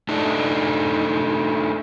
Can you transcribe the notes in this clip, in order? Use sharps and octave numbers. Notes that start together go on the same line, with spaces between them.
A3 D4 D#4